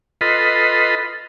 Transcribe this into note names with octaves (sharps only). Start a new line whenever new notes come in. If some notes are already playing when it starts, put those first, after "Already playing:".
F4 A4 B4 D#5 B5 C6